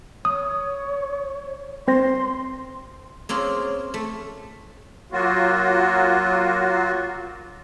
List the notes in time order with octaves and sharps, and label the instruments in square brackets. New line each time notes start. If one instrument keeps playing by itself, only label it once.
[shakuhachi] C#5 [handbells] D#6
[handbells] C4 C5 A#6 [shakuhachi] C6
[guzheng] A#3 C4 C#4 F4 G#4
A3
[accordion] F#3 A#3 F4 F#4